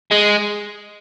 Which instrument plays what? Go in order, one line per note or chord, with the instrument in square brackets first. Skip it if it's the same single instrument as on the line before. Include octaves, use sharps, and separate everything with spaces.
[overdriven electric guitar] G#3